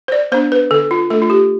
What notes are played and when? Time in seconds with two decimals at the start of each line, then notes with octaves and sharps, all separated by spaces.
0.08 C5
0.12 D5
0.32 B3 D4 C5
0.52 B4
0.71 D3 A4
0.91 F4
1.10 A3 D4 A4
1.22 F4
1.30 G4